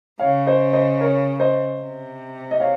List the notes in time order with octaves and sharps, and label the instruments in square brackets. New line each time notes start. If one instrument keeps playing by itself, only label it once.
[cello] C#3 [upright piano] C#5 F5
[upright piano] C5 D#5
C5 D#5
A#4 C#5
C5 D#5
[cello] C3
[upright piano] D#5
C#5 F5